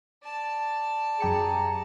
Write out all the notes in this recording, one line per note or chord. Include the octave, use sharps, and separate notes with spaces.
D5 A5
F#2 G4 G#4 A#5 C#7